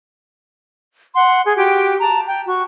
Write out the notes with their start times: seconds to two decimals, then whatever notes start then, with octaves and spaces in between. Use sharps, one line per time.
1.14 F#5 C6
1.44 G#4
1.56 F#4 G4 G5
2.00 A5 A#5
2.26 G5
2.47 F#4 C#6